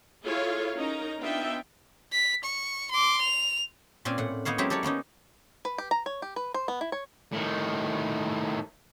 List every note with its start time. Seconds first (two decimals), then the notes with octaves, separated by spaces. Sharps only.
0.24 E4 F4 G#4 A4 C#5 F5
0.75 C#4 D#4 A#4 A#5
1.22 B3 D4 D#4 F4 E5 G5
2.12 B6
2.44 C#6
2.92 C6 D6
3.22 F7
4.05 A#2 C4 C#4 D5 G#5
4.18 A2 F#5
4.45 A#3 B3 D#4 C#5 F5
4.58 F#3 G#3 C4 C#4 E4 G4
4.70 G4 A4 A#4 C#5 D5
4.83 A#3 B3 C#4 D#4
5.65 B4
5.78 G4
5.91 A#5
6.06 C#5
6.22 G4
6.36 B4
6.54 C5
6.68 B3
6.81 E4
6.92 C#5
7.32 A2 D#3